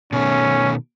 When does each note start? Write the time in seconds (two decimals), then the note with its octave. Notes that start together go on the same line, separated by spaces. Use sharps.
0.13 B2 D#3 A3 C#4